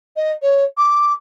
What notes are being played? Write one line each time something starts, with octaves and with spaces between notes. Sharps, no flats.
D#5
C#5
D6